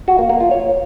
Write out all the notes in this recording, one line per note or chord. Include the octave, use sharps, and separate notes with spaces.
F#4
A#3
A#3
F4
C#5